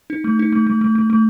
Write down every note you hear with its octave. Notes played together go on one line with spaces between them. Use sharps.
D#4
A3
D#4
A3
A3
A3
A3
A3